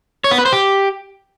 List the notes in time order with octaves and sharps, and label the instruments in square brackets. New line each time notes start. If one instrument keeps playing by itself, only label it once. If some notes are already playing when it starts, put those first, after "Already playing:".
[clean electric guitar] C#5
B3
B4
C5
G4